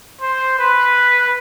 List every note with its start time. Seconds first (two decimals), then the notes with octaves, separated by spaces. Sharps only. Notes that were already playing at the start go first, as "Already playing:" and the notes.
0.21 C5
0.59 B4